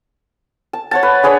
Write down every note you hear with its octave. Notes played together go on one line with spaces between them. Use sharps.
A5
C#5 F#5 A5
B4
D4 G#4 B4 C#5